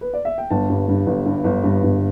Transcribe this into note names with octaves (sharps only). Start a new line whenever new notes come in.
B4
D5
E5
G5
G1 A5
G2
G2
G1
G2
G1
G2
G1